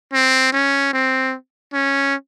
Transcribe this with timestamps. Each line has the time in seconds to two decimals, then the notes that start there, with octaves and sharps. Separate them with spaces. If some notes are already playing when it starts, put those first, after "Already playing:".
0.13 C4
0.53 C#4
0.93 C4
1.73 C#4